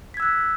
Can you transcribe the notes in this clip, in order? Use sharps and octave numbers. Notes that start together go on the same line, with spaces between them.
E6 F#6 G#6 B6